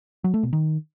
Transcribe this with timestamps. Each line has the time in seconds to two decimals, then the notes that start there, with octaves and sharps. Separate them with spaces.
0.24 F#3
0.34 A3
0.43 B2
0.53 D#3